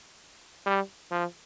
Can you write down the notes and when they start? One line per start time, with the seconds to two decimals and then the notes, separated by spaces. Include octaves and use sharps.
0.67 G3
1.11 F3